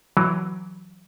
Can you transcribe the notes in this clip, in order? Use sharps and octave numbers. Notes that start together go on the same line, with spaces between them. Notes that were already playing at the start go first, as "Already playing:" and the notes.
E3 F#3